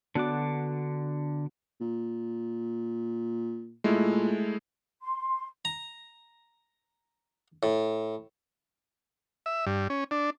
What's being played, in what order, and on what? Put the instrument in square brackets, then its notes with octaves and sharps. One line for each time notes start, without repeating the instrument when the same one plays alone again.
[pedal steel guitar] D3 D6 [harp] B3 F#4 F#6 [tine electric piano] D4
[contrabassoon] A#2
[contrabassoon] A#2 [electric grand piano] G#3 A3 E4
[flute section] C6
[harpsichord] A#5
A2
[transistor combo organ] E5
G2
C#4
D4